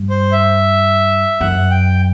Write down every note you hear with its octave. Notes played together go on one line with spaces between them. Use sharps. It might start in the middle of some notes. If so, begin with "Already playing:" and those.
Already playing: G2
C5
E5
F#2 F#5
G5